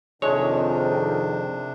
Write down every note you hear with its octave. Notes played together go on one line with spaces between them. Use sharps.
F2 C3 D#3 G#3 D4 C#5